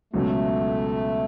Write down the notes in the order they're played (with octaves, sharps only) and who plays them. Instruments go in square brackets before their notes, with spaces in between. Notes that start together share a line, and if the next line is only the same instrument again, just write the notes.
[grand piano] C#2 B2 F#3 C#4 [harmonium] A3